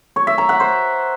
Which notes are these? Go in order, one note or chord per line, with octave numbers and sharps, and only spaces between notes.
C#5
E5
A#5
F#5
C5